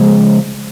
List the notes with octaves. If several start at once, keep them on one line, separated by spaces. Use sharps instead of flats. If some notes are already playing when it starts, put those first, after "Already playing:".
Already playing: C#3 F3 G#3